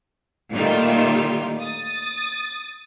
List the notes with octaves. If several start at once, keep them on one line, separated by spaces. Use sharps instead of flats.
A#2 D#3 G3 A3 F4
D#6 A6